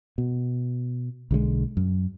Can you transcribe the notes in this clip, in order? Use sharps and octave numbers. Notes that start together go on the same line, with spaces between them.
B2
B1 D3 G3 G#3
F#2